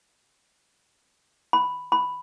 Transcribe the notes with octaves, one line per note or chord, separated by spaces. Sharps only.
B5
B5